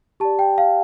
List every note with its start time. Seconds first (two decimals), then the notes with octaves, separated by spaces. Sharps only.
0.20 G4 D5 A5
0.39 G5
0.58 F5